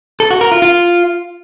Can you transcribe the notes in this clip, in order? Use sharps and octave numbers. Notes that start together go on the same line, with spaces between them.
A4
F#4
A#4
F4
F4